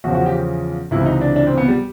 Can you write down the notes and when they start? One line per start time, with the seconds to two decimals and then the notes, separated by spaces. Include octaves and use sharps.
0.04 E2 C#3 F3 F#4
0.14 F#4
0.26 G4
0.91 C#2 C3 E3 E4
1.06 D#4
1.21 D4
1.36 D4
1.47 C4
1.58 B3
1.68 G3